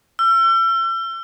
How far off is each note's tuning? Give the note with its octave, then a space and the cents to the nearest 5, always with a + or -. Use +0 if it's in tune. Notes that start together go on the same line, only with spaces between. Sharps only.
E6 +40